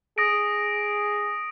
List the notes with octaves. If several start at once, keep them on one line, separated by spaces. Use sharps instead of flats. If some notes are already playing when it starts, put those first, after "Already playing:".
G#4 D#6 A#6 D7